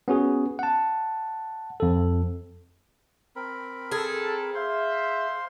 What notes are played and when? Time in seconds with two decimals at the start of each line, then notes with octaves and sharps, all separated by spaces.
0.08 B3 C#4 F#4 G#4
0.59 F#5 A5
1.80 F2 A4
3.36 C4 A#4 B5
3.92 G#4 A4
4.54 C5 E5 F5 C6